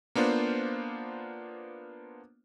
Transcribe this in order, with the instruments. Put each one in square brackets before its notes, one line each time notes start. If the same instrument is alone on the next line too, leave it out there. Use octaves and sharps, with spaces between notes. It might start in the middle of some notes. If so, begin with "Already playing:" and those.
[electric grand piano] A#3 B3 D4 F4 C5